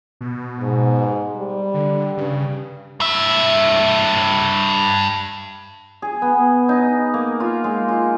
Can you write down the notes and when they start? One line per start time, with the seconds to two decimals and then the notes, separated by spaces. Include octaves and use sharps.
0.21 B2
0.60 G#2
1.36 G3
1.74 D3
2.18 G2 C#3
3.00 G2 E5
6.02 G#4
6.22 B3
6.69 D#4
7.14 A#3
7.40 F4
7.64 G#3
7.88 F4